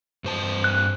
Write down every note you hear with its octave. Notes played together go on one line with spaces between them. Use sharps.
G2 C5 A5
F#6